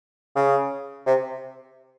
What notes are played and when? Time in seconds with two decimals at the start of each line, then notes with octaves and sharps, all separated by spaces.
0.36 C#3
1.06 C3